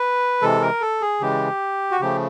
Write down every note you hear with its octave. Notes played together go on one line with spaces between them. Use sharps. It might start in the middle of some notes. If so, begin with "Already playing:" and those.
Already playing: B4
C3 E3 G#3 A4
A#4
A4
G#4
C#3 E3 G#3 G4
F#4
C#3 F3 A3 G4